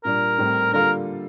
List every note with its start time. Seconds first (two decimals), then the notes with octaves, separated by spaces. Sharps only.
0.04 A#2 G3 D4 A#4
0.38 A2 G3 C4 G4
0.72 D3 G3 A#3 F4 A4 A#4